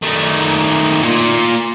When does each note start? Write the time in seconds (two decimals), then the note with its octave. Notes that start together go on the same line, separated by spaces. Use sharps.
0.02 D#3 A3
1.01 A#2